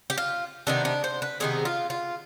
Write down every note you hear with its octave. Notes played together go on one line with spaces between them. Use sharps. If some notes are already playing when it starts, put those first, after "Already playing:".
G4
F4
C3 D#3 B3 D4
D4
C5
B4
C3 D#3 B3 G#4
F4
F4